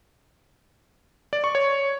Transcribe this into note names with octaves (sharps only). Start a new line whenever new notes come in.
D5
C#6
C#5